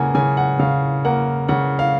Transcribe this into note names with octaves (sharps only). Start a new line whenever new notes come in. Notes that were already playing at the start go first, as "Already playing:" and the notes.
Already playing: C#3 A#3 F#5 G#5
C#3 G#5
F#5
C#3 F5
A#3 F#5
C#3 F#5
F5